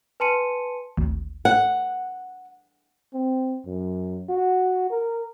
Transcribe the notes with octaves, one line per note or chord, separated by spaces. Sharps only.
B4 G#5 A5 C6 C#7 D#7
G#1 D2
F#5
C4
F#2
F#4
A#4